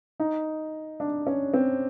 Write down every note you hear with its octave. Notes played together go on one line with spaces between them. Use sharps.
D#4
D4
C#4
C4